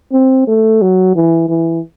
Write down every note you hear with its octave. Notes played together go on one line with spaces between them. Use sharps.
C4
A3
F#3
E3
E3